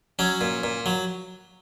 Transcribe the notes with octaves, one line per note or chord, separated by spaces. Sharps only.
F#3 C#4
A#2
A#2
F#3